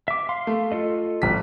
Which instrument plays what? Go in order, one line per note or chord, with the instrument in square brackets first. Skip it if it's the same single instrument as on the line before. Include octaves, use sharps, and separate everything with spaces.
[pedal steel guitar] E5 D6
F5 C6
[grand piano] A3
[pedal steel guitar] F4 A4 D#5
[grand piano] G#1 B6